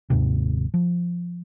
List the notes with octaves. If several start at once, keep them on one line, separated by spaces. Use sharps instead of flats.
D#1 D#2 G#2 C3
F3